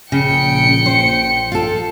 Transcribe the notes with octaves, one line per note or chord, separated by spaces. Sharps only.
A#1 C#3 G5 C#7
C5
F4 A4